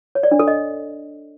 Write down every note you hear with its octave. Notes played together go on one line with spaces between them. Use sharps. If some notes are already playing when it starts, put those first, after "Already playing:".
C#5
D5
D4
A4
D#5